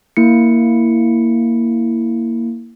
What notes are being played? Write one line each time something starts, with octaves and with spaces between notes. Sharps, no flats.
A#3 E4 C#7